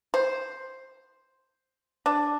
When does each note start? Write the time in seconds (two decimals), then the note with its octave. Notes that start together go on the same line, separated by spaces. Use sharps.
0.14 C5
2.06 D4